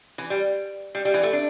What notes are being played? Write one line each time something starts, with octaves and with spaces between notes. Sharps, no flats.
E3
G3
G3
G3
E3
A3
D4